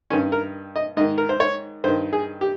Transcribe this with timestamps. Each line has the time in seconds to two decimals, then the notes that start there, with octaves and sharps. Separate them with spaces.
0.10 G2 D#3 C#4
0.32 A#4
0.76 D#5
0.97 G#2 D#3 D#5
1.18 A#4
1.29 C5
1.40 C#5
1.84 G2 C5
1.88 D#3
2.13 G#4
2.41 G4